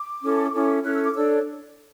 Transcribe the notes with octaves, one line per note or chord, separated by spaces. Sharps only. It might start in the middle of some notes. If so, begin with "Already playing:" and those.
Already playing: D6
C#4 E4 A4
C#4 E4 A4
C#4 E4 A4 F#6
E6
D6
D4 A4 C#5 E6